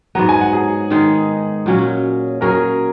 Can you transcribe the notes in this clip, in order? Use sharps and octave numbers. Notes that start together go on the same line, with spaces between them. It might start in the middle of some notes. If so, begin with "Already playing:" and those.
G#2 F#3 B3 A#5
G#5
F#5
G#4 G#5
D#3 G#3 D#4
A#2 F#3 C#4
F#3 C#4 G#4 A#4 A#5